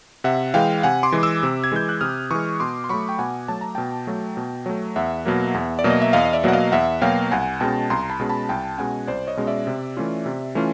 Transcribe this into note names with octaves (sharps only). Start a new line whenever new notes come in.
C3 E5 F#5
E3 G#3 F5 G5
C3 F#5 G#5
C6 D6
E3 G#3
D6 E6
C3
G#6
E3 G#3 G6
F#6
C3 D#6 F6
E3 G#3 C#6 D#6
B2 C6 D6
C6
F#3 A3 B5 C#6
G5
B2 F#5 G#5
F#3 A3 A5
A#5
B2 G5 A5
F#3 A3
B2
F#3 A3
E2 E5 F#5
B2 F#3 A#3
E2
D5
B2 F#3 A#3
D#5
E5
E2 D#5 F5
D#5
D5 E5
B2 F#3 A#3 F#5
D#5 F5
E2 E5 F#5
B2 F#3 A#3 F5 G5
C2 F#5 G#5
B2 G#3 C#4 G5 A5
C2 A#5 C6
A#5
A5 B5
B2 G#3 C#4
A5 B5
C2 G5 A5
B2 G#3 C#4 F#5 G#5
C2 C5 D5
C#5 D#5
B2 G#3 C#4
D5 E5
C3
E3 A3 C#4 F4
C3
E3 A3 C#4 F4